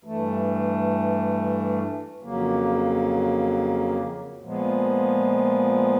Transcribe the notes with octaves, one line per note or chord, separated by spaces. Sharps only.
G2 E3 A3
F2 C#3 F#3 A#3
A#2 F3 G#3 B3